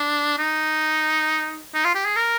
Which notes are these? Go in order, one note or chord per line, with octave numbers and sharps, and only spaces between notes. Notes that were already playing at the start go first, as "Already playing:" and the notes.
Already playing: D4
D#4
D#4
F4
G4
G#4
A#4